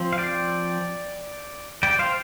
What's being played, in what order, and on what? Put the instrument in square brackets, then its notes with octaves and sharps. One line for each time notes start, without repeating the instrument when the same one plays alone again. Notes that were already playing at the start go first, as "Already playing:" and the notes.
Already playing: [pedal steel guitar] F3 C4
F5
D5 G5
D5 G5
C5 F5